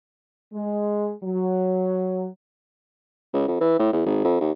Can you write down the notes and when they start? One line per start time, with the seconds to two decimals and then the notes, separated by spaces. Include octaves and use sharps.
0.53 G#3
1.24 F#3
3.33 C#2
3.48 F2
3.61 E3
3.79 A2
3.93 E2
4.06 G#1
4.24 F2
4.41 D#2